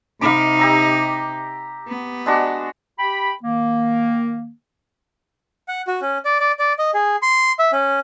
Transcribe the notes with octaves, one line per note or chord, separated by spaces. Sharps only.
C3 D#4 F5 B5 D6
G4 A#5 E6
B3
G#3 D4 F#4
G4 G5 B5
D#3 A#3
F#5
F#4
C#4
D5
D5
D5
D#5
G#4
C6
E5
C#4